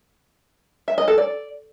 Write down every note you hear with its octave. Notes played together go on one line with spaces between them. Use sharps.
E5
D#5
A4
D5